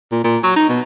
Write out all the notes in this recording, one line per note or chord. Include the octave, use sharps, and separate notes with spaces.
A#2
A#2
F#3
D#4
B2